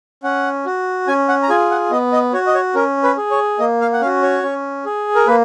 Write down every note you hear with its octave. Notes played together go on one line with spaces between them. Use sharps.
C#4 F#5
F#4
C#4 G#5
F#5
A#5
F4 G#4 G#5
F#5
B3 D#5
D#5
F#4 C#5
D#5
C#5
C#4 A#4
B4
G#4
C#5
A#3 D#5
F5
F#5
C#4 F#4 F5
C#5
C#4
G#4
A#4
A#3 B4